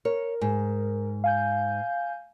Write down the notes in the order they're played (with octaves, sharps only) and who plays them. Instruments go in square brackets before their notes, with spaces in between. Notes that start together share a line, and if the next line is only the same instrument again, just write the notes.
[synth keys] A#4 [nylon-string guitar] C#5
[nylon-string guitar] G#2
[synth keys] F5 G#5 G6